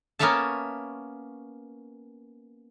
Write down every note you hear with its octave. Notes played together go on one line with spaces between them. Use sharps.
A#3 B3 C#4 C#5 E5 A5